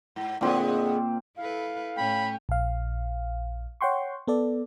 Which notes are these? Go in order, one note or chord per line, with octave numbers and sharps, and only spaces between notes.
G#2
A#2 D3 G#3 B3 C4
E4 A4 B4 F5
A2 C#4 C#5 G5 B5
A#1 F5
C#5 F#5 G5 C6 C#6
B3 A4 D5